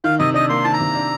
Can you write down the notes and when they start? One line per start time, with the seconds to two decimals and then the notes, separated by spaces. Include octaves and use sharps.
0.04 D#3 F5
0.19 C3 D#5
0.34 D4 D#5
0.49 A#3 C6
0.64 D#3 A5
0.73 A#5
0.80 C3
0.95 D4